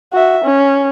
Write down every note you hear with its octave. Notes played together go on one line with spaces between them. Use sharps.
F#4 E5
C#4